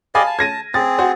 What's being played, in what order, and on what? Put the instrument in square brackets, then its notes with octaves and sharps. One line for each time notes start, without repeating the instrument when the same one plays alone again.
[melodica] G4 D5 D#5 [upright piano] F5 G#5 B5
[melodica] A5
[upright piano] G#6 A#6 D#7
[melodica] C4 G#4 [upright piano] A6
[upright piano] F#4 C5